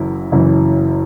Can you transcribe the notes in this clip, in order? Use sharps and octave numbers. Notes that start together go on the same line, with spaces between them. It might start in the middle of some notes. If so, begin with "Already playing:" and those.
Already playing: F#1 F#2 E3 E4
F#1 F#2 E3